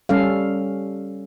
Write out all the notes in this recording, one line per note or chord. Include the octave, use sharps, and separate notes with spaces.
G3 C#4 A4 F5